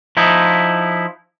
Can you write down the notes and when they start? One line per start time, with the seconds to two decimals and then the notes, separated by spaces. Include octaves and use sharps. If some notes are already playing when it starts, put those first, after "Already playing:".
0.17 F3 D#4 E4